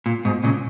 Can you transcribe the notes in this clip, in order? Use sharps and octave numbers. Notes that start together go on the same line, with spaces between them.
A#2
G#2 B2
A#2 C#3